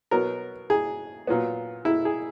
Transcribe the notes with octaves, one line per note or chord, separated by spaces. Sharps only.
B2 F#3 B3 A#4
G#4
A#2 F#3 B3
E4
G#4